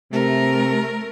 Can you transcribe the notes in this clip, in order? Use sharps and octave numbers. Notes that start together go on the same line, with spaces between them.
C3 A3 A#4